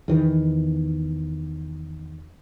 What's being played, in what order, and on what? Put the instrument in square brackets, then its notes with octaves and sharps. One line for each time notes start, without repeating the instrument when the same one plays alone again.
[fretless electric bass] E2 D#3 E3